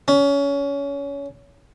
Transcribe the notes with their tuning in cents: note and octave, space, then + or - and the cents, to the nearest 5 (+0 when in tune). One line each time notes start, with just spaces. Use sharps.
C#4 +25